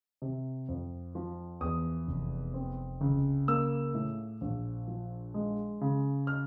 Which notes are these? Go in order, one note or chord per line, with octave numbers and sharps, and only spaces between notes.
C3
F2
F3
E2 D#6
F1
C4
C#2
A#3 E6
A2
A#1
F3
G#3
C#3
F6